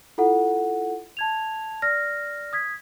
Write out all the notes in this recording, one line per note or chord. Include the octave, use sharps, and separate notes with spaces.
E4 F4 A4 F#5
A5 G#6 F7
D5 F6 A#6
D#6 G#6 B6